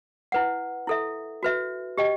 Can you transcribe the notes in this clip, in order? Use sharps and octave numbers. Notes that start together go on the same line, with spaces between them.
E4 B4 F#5
E4 A4 E5
F#4 B4 E5
G4 D#5 G5